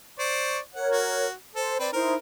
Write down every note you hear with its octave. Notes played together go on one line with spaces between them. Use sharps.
C5 D5 C#6
A#4 C#5 F#5
F#4
A4 C5
C4 B4 D5
D#4 E4 A#4 C5